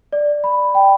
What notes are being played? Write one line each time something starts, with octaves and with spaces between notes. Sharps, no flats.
D5
B5
G5